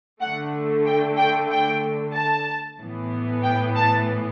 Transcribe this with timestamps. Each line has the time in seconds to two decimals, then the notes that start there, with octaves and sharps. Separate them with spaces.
0.21 D3 A3 F#5
0.86 G5
1.18 G5
1.50 G5
2.14 A5
2.79 A2 E3 B3
3.43 G5
3.76 A5